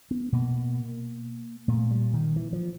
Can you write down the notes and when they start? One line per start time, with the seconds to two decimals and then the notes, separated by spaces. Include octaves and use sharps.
0.11 B3
0.33 B2 A#3
1.68 A#2 A3
1.91 G3
2.14 D#3
2.36 E3
2.53 F3